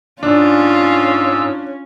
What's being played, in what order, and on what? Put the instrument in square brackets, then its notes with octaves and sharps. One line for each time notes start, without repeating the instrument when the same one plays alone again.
[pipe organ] G#2 E6 [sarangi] C#4 [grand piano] D4 [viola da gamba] F4